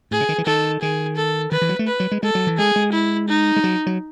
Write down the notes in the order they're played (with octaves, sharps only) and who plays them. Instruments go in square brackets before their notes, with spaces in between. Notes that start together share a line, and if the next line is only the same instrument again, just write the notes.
[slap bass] A2 [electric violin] G#4
[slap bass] C#3
D#3
E3
[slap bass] D#3 [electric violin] A4
[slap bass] D#3 [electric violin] G#4
[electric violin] A4
[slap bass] D#3 [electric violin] B4
[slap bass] E3
F#3
A3
[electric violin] B4
[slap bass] F#3
G#3
[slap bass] G#3 [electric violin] A4
[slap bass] F#3
E3
[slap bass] G#3 [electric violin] G#4
[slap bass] G#3
[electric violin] E4
D#4
[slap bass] G#3
F#3
F#3